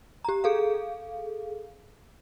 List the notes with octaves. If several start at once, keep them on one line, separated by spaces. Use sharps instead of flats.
G4 A#5
G#4 A4 F5